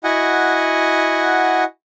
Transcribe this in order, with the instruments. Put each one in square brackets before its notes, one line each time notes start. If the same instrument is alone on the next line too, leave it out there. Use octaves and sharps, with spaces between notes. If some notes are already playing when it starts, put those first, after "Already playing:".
[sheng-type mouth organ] E4 F#4 D#5 F#5 G#5